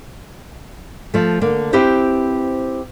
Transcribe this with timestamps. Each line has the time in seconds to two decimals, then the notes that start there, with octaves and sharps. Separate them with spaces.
1.14 F3 A3
1.41 D3 A#3
1.73 C4 E4 G4 B4 C5